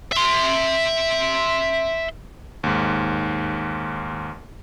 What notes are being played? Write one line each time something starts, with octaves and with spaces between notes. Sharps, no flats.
E5 C6
D#2 G#2